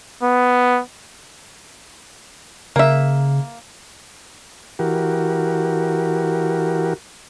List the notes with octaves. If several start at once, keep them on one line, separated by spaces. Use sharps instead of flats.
B3
C#3 A#3 E5
E3 F#4 G4 A#4